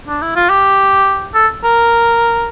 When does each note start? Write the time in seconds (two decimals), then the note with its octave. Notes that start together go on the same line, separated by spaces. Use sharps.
0.08 D4
0.22 E4
0.36 F4
0.50 G4
1.35 A4
1.64 A#4